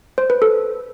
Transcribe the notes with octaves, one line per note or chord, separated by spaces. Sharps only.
C5
B4
A4